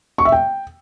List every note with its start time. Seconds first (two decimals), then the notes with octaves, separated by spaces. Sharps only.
0.18 C#6
0.25 E5
0.32 G5